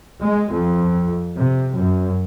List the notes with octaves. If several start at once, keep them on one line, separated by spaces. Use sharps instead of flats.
G#3
F2
C3
F#2